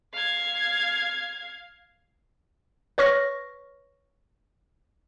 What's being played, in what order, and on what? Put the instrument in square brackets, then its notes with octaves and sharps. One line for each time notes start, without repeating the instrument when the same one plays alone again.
[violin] F5 G#6
[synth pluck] B4 C#5 C#6 F6 A#6